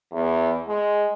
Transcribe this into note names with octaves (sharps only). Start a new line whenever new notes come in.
E2
G#3